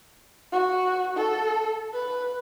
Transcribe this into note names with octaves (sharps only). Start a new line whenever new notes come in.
F#4
A4
B4